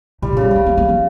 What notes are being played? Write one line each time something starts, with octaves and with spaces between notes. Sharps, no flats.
A2 G3
A#2
C#3
G3
C#3 A3
A#3
A#3
F3